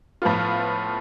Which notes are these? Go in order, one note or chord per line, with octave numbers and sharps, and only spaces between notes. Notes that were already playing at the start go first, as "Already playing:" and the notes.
A2 F3 B3 F4